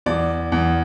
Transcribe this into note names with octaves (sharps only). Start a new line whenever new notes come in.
E2 D5
E2